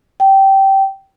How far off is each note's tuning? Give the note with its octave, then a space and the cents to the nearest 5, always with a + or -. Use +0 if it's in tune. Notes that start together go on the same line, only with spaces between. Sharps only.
G5 -15